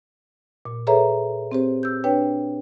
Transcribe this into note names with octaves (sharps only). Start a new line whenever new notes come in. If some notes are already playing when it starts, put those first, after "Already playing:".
A#2
G#4 A4 B4 C#5 E5 A#5
C4 G4 C5
E6 G6
D4 B4 C#5 G5